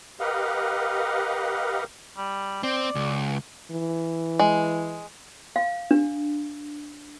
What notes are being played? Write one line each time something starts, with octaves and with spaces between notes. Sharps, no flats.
G4 A#4 B4 D#5 F5 F#5
G3
C4 D5
C#2
E3
G#3
F5
D4